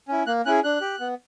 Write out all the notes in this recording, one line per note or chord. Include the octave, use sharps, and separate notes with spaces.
C#4 E4
A#3 F#6
C#4 E4 G#4 F#6
D4 F#6
G4
B3